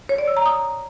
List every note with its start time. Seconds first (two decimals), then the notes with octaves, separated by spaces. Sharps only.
0.09 C#5
0.18 D5
0.28 E6
0.37 A#5
0.46 D#6